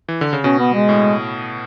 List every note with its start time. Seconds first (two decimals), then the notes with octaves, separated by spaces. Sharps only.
0.08 E3
0.21 D3
0.33 C#3
0.44 B2 C#4
0.59 B3
0.74 G#3
0.89 A2